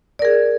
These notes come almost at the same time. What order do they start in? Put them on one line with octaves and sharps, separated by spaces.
D5 A#4 G#4